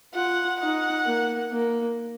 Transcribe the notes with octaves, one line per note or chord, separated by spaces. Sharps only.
F4 F#5
D#4 F#5
A#3
A#3